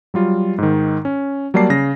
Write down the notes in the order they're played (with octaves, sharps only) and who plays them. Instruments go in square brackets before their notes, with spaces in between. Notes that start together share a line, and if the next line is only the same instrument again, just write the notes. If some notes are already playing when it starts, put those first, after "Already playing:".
[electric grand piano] F#3 G3 F4
G#2 D#3
C#4
F#3 G3 A#3 D5 A5 C7
C#3 A#6